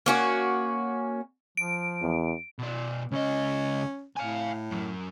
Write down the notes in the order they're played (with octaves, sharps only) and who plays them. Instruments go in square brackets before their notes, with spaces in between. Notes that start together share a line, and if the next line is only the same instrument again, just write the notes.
[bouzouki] A#3 C#4 F#4
[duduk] F3 [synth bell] D7
[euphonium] E2
[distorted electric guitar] B2 D5
[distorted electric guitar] C#2 D#5 [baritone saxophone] C#4
[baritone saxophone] A2 [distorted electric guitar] F5 G#5
[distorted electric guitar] F#2 F#3